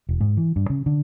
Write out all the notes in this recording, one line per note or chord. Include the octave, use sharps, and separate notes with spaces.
E1
G#2
E3
G2
C#3
D3